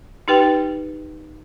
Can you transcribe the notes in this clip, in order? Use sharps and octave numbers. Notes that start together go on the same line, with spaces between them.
D#4 G4 B4 G5